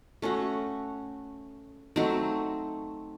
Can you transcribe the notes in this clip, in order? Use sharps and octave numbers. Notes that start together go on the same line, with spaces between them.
A3 C#4 F#4
F#3 A3 C4 D#4